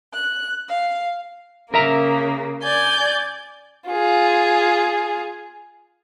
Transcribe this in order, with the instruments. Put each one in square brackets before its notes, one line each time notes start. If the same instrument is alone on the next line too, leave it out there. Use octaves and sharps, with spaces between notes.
[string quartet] F#6
F5
[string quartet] C#3 A#3 [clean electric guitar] A#4 E5 A#5
[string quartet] D5 G#5 G6
[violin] F4 G#4